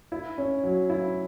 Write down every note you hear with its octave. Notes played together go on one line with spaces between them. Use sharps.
E4
C#4
F#3
E4